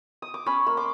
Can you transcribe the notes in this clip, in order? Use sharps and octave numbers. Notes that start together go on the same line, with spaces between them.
D#6
D6
C#4 B5 C#6
A#3 C#6
C6 D6